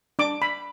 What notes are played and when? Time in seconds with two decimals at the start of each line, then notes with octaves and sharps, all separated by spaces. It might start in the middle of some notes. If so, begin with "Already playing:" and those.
0.19 D4 D6
0.42 B5